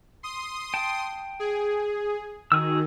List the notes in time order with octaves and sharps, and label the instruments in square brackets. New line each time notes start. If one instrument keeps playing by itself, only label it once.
[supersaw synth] C6 D#6
[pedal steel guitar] G5 A5
[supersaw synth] G#4
[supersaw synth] D#3 [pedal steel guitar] F#4 G#4 E6